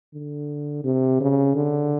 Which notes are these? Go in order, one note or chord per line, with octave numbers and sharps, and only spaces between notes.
D3
C3
C#3
D3